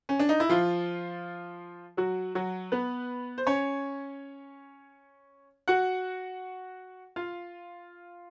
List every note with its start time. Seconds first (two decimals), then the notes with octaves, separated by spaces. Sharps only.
0.09 C#4
0.19 D4
0.29 D#4
0.40 E4
0.49 F3 F4
1.97 F#3 F#4
2.35 F#3 F#4
2.72 B3 B4
3.38 C5
3.47 C#4 C#5
5.68 F#4 F#5
7.16 F4 F5